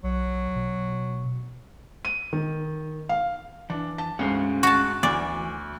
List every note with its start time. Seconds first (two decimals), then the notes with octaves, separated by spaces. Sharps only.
0.04 B1 F#3
0.56 B2
2.05 D#7
2.33 D#3
3.09 F5
3.70 E3 D4
3.98 A5
4.19 D2 G#2 C#4 F5
4.63 F#4 A5
5.03 D2 E3 D5 G#5